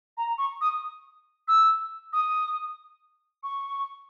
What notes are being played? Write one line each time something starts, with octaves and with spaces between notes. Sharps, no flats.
A#5
C#6
D#6
E6
D#6
C#6